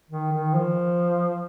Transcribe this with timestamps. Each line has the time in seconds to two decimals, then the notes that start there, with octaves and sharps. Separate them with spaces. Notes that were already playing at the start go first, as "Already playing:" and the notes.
0.11 D#3
0.32 D#3
0.54 F3